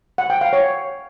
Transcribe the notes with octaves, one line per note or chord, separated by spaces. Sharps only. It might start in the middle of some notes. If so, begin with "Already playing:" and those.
F#5
G5
F5
C#5